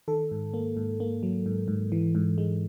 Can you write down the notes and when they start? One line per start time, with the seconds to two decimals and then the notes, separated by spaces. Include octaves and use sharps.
0.08 D#3 A4
0.31 G#2
0.54 A#3
0.77 G#2
1.00 A#3
1.23 F#3
1.46 G#2
1.68 G#2
1.92 E3
2.15 G#2
2.38 G#3